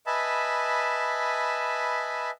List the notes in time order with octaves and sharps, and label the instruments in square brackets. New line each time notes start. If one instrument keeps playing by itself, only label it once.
[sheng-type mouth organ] B4 D#5 E5 G#5 A5 B5